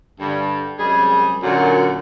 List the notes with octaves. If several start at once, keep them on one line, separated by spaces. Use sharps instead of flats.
G2 D3
F#2 C3 G3 G#3 G#4
F#2 A#2 D3 F#4